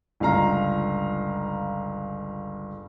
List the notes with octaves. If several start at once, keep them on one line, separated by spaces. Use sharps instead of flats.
G1 C#2 F5 A#5